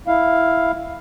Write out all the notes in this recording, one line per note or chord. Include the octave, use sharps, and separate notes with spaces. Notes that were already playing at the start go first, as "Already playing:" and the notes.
E4 F5